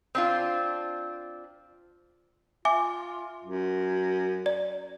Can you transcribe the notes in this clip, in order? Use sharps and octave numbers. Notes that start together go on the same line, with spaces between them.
C4 D4 F4
F4 E5 G#5 D6
F#2
D5